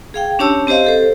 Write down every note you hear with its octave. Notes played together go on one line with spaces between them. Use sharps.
G#4 F5 G5
C#4 D4 G4 C#5 A5 E6
C4 G4 C5 D#5 F5
G4 A4 C5